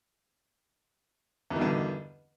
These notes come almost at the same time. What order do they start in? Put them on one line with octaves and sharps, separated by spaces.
E2 D#3 B2 G2 D3